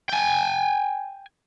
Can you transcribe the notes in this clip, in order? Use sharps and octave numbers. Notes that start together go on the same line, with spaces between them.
G5 G#5